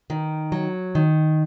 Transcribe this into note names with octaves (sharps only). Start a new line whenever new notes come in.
D#3
F#3
D#3